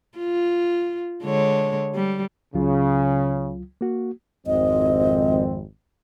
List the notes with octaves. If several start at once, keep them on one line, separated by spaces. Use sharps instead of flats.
F4
D3 G#3 C#5
G3
C#2 C#3 F#3 F4
A#3 F#4
G#1 F2 C4 D#5